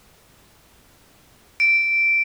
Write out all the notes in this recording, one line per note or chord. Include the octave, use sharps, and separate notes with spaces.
D7